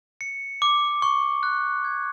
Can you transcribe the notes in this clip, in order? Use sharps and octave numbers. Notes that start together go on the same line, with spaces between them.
C#7
D6
C#6
F#6
G#6